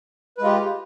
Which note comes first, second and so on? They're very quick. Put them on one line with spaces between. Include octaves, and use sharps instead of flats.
B4 G#3 F4 G4